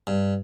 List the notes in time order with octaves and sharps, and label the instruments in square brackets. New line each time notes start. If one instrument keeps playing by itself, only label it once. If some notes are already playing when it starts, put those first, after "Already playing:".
[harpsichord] G2